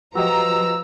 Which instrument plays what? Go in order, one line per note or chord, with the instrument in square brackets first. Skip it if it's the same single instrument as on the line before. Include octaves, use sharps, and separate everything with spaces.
[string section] F3 A#5 [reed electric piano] F#4 G4 D#5 [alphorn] B4 [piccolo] E6